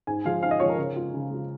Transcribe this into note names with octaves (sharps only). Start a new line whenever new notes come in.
G#2 G#5
F3 G#3 F4 F5
G#2 F5
D#5
F3 G#3 F4 C#5
A#4
C#3
G#3 F4
C#3
G#3 F4